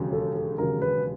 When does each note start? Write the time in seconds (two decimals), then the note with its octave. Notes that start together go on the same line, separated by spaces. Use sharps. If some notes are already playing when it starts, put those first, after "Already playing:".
Already playing: E1 D#2 C#3 F#3
0.13 A4
0.35 A4
0.58 E1 D#2 C#3 F#3 A#4
0.82 B4